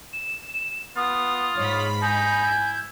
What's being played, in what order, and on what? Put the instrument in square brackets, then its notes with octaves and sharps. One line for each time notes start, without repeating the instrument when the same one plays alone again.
[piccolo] E7
[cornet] B3 [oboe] F4 [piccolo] D#6
[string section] G#2 B5 [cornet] C#5
[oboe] D#4 [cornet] G#5 [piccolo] G6
[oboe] E4